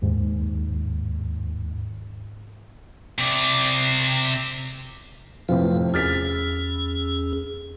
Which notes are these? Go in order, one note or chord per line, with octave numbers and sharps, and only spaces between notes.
D#2 G#2
C3 D5
F2 A2 C3 F3 B4 F5
E2 C#4 G#4 F6 A6 B6